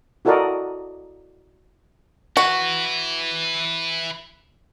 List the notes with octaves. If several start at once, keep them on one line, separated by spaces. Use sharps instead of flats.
E4 F#4 A4 A#4 D5 D#5
E4 F#4 B4